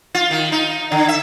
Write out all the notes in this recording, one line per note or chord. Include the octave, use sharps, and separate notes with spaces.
F4
D#3
D#4
D3
E5